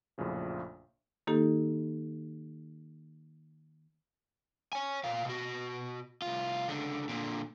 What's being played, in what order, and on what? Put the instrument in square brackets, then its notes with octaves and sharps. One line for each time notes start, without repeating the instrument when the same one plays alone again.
[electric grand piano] A#1 F#2 A2 C#3 F3
[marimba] D#3 A#3 D#4 G4 A4
[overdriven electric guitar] C#5 G#5
A#2 F5
B2 F#4
C2 F4
C#2 D3
A#2 D3